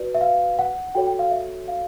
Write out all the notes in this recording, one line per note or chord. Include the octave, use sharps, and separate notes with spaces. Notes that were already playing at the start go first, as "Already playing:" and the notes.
Already playing: F#4 B4 D5
E5
F5
F#5
F#4 A4 C#5 G5
G5
F5
E5
F5